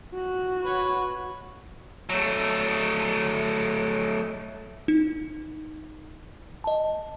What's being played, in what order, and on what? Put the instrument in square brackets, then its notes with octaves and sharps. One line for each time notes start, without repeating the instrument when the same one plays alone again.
[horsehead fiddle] F#4
[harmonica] B4 C#5
[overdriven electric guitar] F#3 A3
[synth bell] D#4
D#5 A5